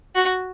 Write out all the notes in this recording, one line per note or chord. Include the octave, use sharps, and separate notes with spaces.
F#4